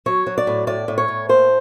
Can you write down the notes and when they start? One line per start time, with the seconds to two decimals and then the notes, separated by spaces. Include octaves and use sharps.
0.06 F#3 C#5
0.27 F#3
0.38 D5
0.47 A2
0.67 A2 D5
0.88 A2
0.98 C#5
1.08 A2
1.29 A#3 C5